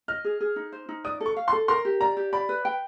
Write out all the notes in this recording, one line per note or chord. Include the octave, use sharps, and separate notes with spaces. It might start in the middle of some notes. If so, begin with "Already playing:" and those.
D#5 F6
G#4
G#4
D#4
C5
D#4
D5 D#6
A4
C#6
F5
C6
A4
A#4 C6
G4
D5 A#5
G4
D5 B5
B4
G5